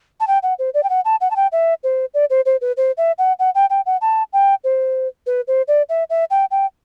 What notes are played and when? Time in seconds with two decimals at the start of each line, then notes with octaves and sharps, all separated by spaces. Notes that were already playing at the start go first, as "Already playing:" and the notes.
0.20 A5
0.27 G5
0.43 F#5
0.59 C5
0.74 D5
0.83 G5
0.90 F#5
1.05 A5
1.21 F#5
1.31 A5
1.36 G5
1.52 E5
1.84 C5
2.14 D5
2.30 C5
2.46 C5
2.61 B4
2.77 C5
2.97 E5
3.18 F#5
3.39 F#5
3.55 G5
3.70 G5
3.86 F#5
4.01 A5
4.33 G5
4.64 C5
5.27 B4
5.48 C5
5.68 D5
5.89 E5
6.10 E5
6.30 G5
6.51 G5